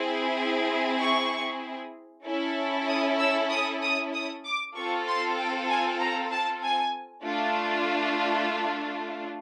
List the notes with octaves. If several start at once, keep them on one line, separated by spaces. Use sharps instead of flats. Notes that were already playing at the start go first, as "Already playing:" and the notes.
Already playing: C4 E4 G#4
C#6
C#4 E4 A4
D#6
E6
D#6
D#6
D#6
D6
C4 F4 A4 C#6
C6
G5
G#5
A#5
A5
G#5
A3 D4 F4